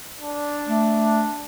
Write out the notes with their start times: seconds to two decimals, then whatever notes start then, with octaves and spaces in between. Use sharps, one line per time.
0.21 D4
0.68 A3